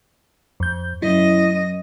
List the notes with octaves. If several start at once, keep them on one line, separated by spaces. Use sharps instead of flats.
F2 G6
F#2 E4 D#5